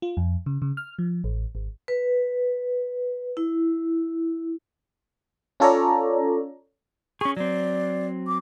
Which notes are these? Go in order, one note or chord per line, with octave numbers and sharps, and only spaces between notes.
F4
F2
C#3
C#3
F6
F3
A1
G#1
B4
E4
C#4 F4 A4 C#5 D5 A#5
C#4 G#4 C#6
F#3 C4 D5
D6